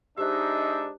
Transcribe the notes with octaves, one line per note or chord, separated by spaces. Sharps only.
G#3 D4 D#4 G4 C5 E5 F#6